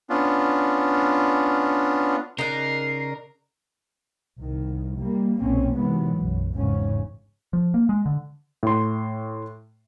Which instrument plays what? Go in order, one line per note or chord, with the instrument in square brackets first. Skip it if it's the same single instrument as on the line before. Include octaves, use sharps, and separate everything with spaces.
[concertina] B3 C#4 D4 F4
[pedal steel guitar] C#3 D#5 F#6 [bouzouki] D#4 D5 [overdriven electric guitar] A#4 [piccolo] C7
[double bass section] C2 D#3
G3 A#3
F#1 B1 A#2 A#3 C4 C#4
C3 D#3 E3 F#3 G#3 B3
B1 F#2
G#1 E2 G#2 C#3 C#4
[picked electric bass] F3
A#3
G#3
D3
[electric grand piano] A2 C6